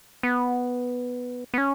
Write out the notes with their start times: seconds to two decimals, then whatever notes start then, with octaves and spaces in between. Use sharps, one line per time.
0.23 B3
1.54 B3
1.58 C#4